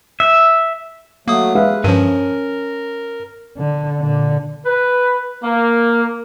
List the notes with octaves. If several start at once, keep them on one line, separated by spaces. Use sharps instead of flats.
E5
F#3 A3 A#3 D#6
G#3 B4 E5 F5
G2 F3 C#4 A#4 D#7
D3
A#2 D3
B4
A#3